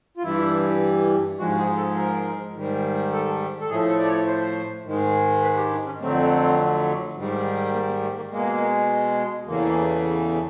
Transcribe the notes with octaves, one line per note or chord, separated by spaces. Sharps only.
F4
G2 E3 G3 E4
G#2 F3 G#3 F#4
G#4
A4
A#4
G#2 D#3 G3
A4
A4
A2 F3 A3 G#4
A4
D5
C#5
C5
G#2 D#3 G#3
B4
G4
D4
C#4
F2 D3 F#3 A3 C4
G#2 D#3 G3
A#3
A#3
A3
A#3
B2 G#3 A#3
E2 C#3 E3 A3 A#3